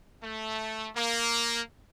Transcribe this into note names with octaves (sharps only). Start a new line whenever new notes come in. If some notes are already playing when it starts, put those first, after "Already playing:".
A3
A#3